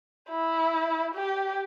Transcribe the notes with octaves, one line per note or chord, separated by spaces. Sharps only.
E4
G4